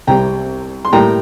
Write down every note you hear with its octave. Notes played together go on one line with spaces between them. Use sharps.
C2 C3 G3 C4 G5 A#5
C6
A2 G3 A#3 G5 A#5